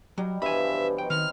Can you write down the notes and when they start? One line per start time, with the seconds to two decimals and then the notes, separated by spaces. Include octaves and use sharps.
0.18 F#3 G3 D#5 A#5
0.42 G2 B2 E3 F3 E5 G#5 B5
0.98 F#3 D#4 G5
1.10 D#3 C4 B4 F6